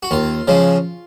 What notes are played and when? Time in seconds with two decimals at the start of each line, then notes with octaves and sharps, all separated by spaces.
0.03 F#4
0.11 D#2 F4
0.48 C#3 F3 G#3